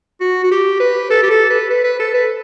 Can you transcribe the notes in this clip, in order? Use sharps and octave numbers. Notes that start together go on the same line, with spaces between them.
F#4
F#4
G4
B4
A4
G4
A4
B4
B4
B4
A4
B4